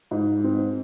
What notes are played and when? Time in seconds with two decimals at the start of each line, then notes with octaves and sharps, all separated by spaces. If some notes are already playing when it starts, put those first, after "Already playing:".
0.11 G#2
0.44 C4